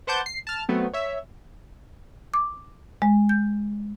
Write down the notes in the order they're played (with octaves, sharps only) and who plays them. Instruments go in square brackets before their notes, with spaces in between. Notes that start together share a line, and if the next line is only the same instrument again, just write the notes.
[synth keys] B4 C5 F#5 A5 D6 G6
C7
A5 F6
F#3 A3 B3 C4
C#5 E5
[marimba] D6
G#3
G6